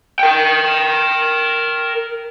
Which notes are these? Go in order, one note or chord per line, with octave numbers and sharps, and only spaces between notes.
A#4 G5